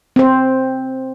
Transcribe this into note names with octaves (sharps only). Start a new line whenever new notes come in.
C4 C5